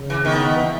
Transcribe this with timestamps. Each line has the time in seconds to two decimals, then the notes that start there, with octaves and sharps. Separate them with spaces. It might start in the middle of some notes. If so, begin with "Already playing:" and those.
Already playing: C#3
0.10 E3
0.25 D#3 B3
0.56 E3